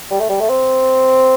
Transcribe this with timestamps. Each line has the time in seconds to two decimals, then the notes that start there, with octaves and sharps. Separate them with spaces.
0.11 G3
0.20 A3
0.29 G3
0.40 A3
0.49 C4